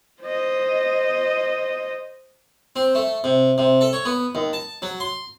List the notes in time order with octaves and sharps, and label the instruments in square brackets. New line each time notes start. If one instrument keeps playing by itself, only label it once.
[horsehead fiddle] C5 D#5
[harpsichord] C4
A3
C3
C3
A4
C#5
B3
D#2
A5
F#3
C6